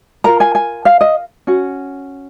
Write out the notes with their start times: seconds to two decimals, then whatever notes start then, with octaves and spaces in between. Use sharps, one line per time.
0.24 F4 A#4 A#5
0.40 G#5
0.55 G#5
0.85 F5
1.01 D#5
1.47 C#4 F#4